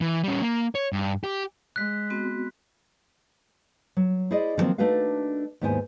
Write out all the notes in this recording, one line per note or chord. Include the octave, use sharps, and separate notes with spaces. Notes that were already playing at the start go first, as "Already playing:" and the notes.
E3
G3 C#4
A#3
C#5
G2
G4
G#3 F#6 B6
B3 C4 F#4
F#3
E4 G#4 C5 D5 D#5
D3 D#3 F3 F#3 A#3 C4
A3 D4 D#4 F#4 B4 F5
D#2 G#2 B3 E4 C5 G#5